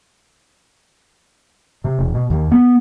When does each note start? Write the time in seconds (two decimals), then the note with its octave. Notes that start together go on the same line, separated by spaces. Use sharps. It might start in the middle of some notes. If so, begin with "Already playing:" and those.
1.84 C3
1.99 E1
2.14 B2
2.30 D#2
2.52 B3